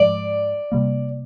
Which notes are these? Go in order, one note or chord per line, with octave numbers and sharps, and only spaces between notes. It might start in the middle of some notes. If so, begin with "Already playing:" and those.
Already playing: G#2 F3 G#3 D5
C3 G3 A#3